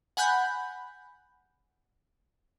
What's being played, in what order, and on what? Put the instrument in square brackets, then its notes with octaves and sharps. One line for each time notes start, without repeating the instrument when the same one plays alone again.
[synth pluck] F#5 G#5 B5 F#6 G6